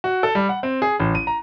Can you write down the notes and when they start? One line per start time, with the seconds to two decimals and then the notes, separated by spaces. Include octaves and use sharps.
0.04 F#4
0.23 A4
0.35 G3
0.49 F#5
0.63 C4
0.82 G#4
1.00 A1
1.15 D#7
1.27 A#5